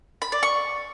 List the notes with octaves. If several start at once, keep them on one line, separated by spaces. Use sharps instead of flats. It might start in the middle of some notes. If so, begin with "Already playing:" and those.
B5
D5
C#6